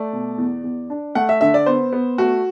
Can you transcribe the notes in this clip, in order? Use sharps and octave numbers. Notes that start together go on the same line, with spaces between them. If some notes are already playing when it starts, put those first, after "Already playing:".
Already playing: A3 D5
B2
E2
E2
D4
A3 F#5
E5
D3 E5
D5
B3 C5
B3
A3 F#4